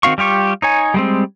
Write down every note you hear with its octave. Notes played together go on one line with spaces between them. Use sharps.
D#3 C4 F#4 F5 C#6
G3 F4 G4 C#6
D#4 C#5 G#5
G3 G#3 C4